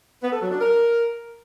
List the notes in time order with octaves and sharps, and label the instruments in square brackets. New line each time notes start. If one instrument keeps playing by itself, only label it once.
[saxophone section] B3
A4
F#3
D4
A#4